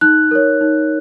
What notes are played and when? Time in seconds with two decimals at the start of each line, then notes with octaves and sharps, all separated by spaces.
0.01 D#4 F#6
0.31 A#4 C#5
0.61 D#4